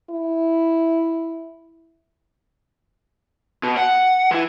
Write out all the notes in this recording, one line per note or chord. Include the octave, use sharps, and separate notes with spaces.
E4
B2
F#5
E3 E4